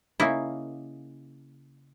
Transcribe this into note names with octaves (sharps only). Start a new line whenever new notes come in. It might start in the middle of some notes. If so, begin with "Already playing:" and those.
C#3 A#3 D#4 E4